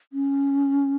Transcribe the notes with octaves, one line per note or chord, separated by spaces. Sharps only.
C#4